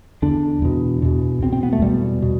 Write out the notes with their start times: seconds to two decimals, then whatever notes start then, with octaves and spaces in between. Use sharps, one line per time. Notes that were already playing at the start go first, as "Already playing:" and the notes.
0.22 E2 D3 D4
0.62 E2 B2
1.02 E2 B2
1.42 E2 B2 C4
1.53 C4
1.63 B3
1.73 A3
1.82 E2 B2 G3
2.22 B2